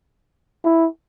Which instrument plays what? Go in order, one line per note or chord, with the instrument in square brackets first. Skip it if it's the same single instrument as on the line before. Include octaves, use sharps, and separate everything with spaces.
[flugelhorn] E4